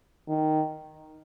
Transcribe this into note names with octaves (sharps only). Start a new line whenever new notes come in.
D#3